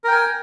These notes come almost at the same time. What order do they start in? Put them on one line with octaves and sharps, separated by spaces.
A#4 G5 G#5